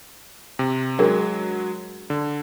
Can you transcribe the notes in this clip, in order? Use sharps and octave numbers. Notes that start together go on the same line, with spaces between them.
C3
F#3 G#3 D4 G#4 A#4
D3